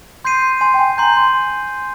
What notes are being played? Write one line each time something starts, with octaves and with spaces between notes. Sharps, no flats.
C6 G6 C7 D#7
G#5 C6
G5
G#5
G#5
A#5 C6 G6
C6